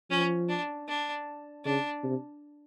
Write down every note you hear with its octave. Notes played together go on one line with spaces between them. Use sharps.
F3 C#4
D4
D4
C#3 D4
C3